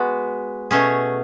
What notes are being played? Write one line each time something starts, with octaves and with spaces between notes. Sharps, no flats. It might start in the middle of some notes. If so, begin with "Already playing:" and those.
Already playing: G#3 B3 F#4
B2 A3 C#4 G#4